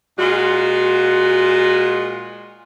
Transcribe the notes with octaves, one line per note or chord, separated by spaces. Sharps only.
A#2 G#3 F4 F#4